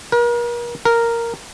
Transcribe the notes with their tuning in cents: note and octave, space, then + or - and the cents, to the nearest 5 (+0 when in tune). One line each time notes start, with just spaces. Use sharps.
A#4 +40
A#4 -5